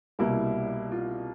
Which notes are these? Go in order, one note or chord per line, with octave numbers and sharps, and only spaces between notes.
C2 B2 G3 A#3 E4
F4